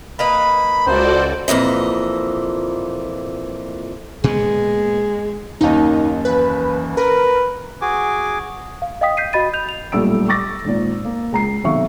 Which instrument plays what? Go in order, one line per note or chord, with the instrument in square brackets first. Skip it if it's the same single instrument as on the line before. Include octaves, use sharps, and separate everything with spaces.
[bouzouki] A#3 D#4 B4 [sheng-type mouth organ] B5
[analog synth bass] C#2 [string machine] F#4 A4 D5 [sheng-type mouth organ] C5
[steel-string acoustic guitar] F2 A#2 E3 D#5
[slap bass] A#2 B3 [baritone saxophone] G#3
[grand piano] F#1 D#2 [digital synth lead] D#4
[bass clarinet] E3 [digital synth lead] B4
[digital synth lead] A#4 [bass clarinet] B4
[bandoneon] F#4 G#4 G#5 D6
[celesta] F5
D#5 F5 G5 D#6 B6
G6 B6 C7 D#7
F#4 D#5 B5 A6 D#7
G6 F7
F7
[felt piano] B1 A#2 G3 A3 E6 D7
C#6 D6 A6 A#6
G#1 A#2
A#3
C#2 A#5 C7
B1 C3 D#3 E5 F5 C#6